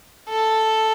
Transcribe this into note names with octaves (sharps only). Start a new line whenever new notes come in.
A4